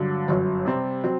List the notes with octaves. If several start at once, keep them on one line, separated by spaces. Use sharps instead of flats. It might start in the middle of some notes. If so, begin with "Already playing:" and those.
Already playing: G2 D3 F#3
G1 F#2 F#3
C3 G3 C4
F#3 C4